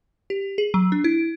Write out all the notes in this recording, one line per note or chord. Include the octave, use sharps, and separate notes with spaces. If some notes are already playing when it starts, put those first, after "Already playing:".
G4
G#4
F#3
D4
E4